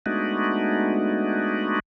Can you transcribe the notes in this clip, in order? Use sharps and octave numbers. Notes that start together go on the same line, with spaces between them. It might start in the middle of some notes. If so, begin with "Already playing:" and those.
G#3 A3 B3 D4 D#4 F#4